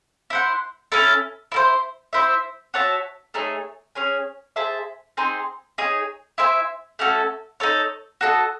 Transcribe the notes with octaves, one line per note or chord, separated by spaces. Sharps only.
E4 C5 F#5
C#4 E4 A4
E4 A4 C5
C4 E4 C5 E5
F#4 C#5 E5 A5
A3 D#4 G#4 C#5
C#4 G#4 C#5 G#5
G#4 C5 E5 A5
C4 D#4 G#4 C5
D#4 G#4 C#5
E4 C5 E5 G#5
A3 C#4 F#4 A4
D#4 A4 C#5
F#4 A4 D#5